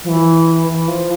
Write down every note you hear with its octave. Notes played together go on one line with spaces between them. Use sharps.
F3
E3
E3
F3